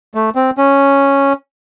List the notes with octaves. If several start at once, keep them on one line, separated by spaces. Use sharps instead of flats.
A3
C4
C#4